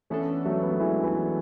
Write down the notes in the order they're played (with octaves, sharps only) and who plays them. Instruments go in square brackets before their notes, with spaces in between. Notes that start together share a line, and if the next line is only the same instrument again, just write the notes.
[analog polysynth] E3 B3 D4 A4 [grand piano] A3 C#4
[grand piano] F#3 A3
B3
A3
E3 G#3
E3